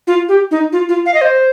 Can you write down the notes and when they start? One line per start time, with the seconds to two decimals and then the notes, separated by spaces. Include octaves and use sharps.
0.07 F4
0.29 G4
0.51 D#4
0.72 F4
0.89 F4
1.06 F5
1.14 D#5
1.21 C5